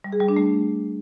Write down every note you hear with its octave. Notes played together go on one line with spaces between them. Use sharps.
G3
G#4
G3
D4
A3